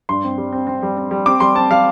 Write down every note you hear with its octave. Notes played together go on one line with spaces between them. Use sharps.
G2 C6
C4
G3
C4
C4
G3
C4
G3
C4 D6
G3 C6
C4 A5
G3 F5